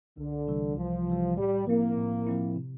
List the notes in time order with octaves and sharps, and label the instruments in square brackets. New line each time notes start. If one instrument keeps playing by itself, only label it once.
[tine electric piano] C2 [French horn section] D3
[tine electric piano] C3 E3 G3
[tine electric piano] C2 [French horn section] F3
[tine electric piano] C3 E3 G3
[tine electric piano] A2 [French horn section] G3
[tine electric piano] F3 C4 E4 [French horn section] A#3
[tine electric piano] A2
F3 C4 E4
C3